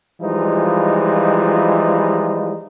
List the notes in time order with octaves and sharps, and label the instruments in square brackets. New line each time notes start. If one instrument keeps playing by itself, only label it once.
[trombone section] E3 F3 G3 G#3 D#4 F4